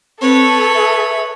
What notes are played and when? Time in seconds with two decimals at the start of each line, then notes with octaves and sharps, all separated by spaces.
0.21 C4 A4 B4 C#5
0.75 E5